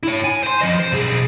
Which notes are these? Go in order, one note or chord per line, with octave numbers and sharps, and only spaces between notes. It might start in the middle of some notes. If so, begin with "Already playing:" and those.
E4 C#5
G#5
C5 C6
F3 D#5
C5
B1 G#4